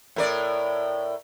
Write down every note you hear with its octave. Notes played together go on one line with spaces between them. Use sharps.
A2 A#4 D5